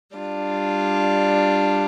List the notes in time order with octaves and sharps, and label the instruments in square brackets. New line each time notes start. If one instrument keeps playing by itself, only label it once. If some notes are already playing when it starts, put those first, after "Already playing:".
[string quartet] G3 D4 F4